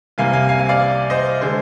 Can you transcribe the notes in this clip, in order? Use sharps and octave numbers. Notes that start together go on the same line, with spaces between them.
C2 C3 G3 A#3 F5 G#5
F5 G#5
F5 G#5
F5 G#5
D5 F5
C5 D#5
D3 G#3 G#4 C5